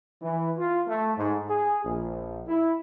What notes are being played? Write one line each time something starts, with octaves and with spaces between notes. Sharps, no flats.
E3
F4
A3
G#2
G#4
A#1
E4